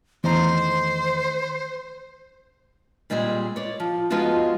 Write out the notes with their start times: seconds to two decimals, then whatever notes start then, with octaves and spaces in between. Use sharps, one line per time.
0.24 E2 D#3 A3 C5 A#5
3.10 A#2 G3 G#3 C4 G#4
3.56 C#5 D5
3.80 F3
4.10 F3 G#3 B3 D#4 F4 F#4